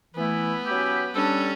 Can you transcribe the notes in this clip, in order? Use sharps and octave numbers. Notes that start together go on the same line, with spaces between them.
E3 A3 B3 E4
F#3 C#4 E4 G4
G3 C#4 D4 A4